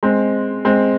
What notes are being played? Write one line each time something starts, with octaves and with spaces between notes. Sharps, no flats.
G#3 C4
G#3 C4